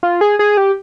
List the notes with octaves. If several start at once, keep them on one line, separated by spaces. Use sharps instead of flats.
F4
G#4
G#4
G4